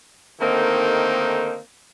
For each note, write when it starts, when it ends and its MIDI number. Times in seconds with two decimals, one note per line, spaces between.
0.41 1.59 50
0.41 1.59 51
0.41 1.59 57
0.41 1.59 58
0.41 1.59 60
0.41 1.59 63